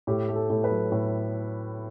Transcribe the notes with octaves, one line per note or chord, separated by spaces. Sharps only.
A2 G4
A3
A4
A2
B4
F#3
A2